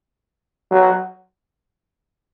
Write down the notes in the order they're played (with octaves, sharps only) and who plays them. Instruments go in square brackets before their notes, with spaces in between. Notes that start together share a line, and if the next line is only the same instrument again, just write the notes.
[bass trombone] F#3